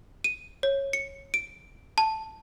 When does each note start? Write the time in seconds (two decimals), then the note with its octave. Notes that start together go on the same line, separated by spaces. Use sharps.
0.24 D#7
0.63 C#5
0.93 C#7
1.34 D7
1.98 A5